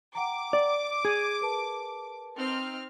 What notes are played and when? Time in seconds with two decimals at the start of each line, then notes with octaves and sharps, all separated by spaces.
0.15 F#5 G5 A#5 D6
0.53 D5
1.05 G#4 G#6 D7 D#7
1.41 A#4 B4 A5
2.36 C4 D#4 F6